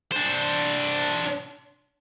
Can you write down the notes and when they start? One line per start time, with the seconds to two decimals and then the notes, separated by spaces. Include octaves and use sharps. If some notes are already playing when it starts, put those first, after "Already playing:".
0.12 D4 C5